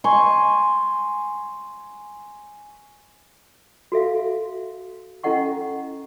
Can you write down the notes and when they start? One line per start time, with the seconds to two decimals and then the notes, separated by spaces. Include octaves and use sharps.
0.04 G#5 C6 C#6
3.92 F#4 A4 E5 F5
5.24 C#4 E4 A4 D#5 F#5 C#6